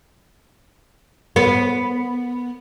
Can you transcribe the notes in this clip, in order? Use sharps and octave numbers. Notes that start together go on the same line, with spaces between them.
B3